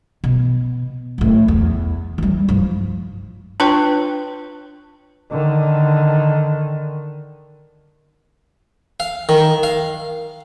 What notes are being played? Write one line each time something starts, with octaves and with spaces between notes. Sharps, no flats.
B2
F#2 A2
E2
E3 G3
G2 F3
D4 F4 B4 C#5 G5 C#6
D3 D#3
F5
D#3
F5